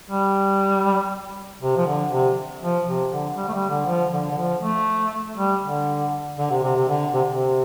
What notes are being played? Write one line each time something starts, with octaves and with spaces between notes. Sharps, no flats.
G3
C3
F3
D3
C3
F3
C3
D3
G3
A3
G3
D3
F3
D3
D3
F3
A3
G3
D3
D3
C3
C3
C3
D3
C3
C3